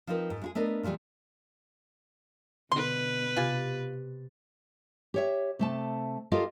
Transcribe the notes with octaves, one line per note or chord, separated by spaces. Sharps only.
F3 C4 D#4 A#4 B4
G#2
G#3 E4 G#4
A3 B3 D4 A#4 D#5
A#2 D3 E3 G3 G#3
B2 D3 B4 C6
C3 F4 G#5 B5 A6
G4 C#5 E5
C3 A3 A5
F4 G4 A4 A#4 D#5 F5